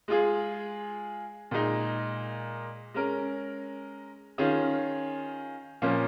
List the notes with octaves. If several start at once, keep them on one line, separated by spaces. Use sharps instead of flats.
G#3 F4 G#4
A#2 G#3 D#4
G#3 C#4 A#4
D#3 C#4 F4 G#4
A#2 F3 A#3 C#4